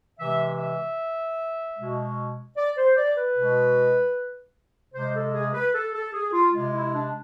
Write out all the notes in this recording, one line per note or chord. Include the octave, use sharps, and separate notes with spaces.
C3 E3 G#3 E5
E5
B2 G#3
D5
C5
D5
B4
B2 G#3
C3 G#3 C5
A4
G#4
B4
A4
A4
G#4
F4
C3 G#3 F4
E4
D4